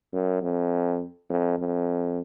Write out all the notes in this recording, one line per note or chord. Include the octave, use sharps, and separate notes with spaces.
F#2
F2
F2
F2